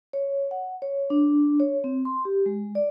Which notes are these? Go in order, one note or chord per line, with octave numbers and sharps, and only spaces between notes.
C#5
F#5
C#5
D4
C#5
C4
C6
G4
G#3
D5